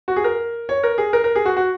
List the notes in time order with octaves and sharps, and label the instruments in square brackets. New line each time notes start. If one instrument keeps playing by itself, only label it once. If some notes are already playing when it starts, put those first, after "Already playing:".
[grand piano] F#4
G#4
A#4
C#5
A#4
G#4
A#4
A#4
G#4
F#4
F#4